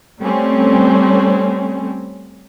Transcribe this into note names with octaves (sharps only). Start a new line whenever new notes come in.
G3 A3 C4 C#4